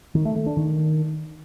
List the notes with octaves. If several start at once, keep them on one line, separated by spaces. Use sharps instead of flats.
D#3
A3
A3
D4
D#3